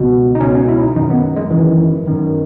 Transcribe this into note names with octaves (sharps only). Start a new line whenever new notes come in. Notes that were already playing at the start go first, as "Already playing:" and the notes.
Already playing: C#2 B2
D#4
C#2 B2 C#4
C#4
E4
D#4
F#2 D#3 D#4
B3
G#3
F#2 D#3 E3
F#2 D#3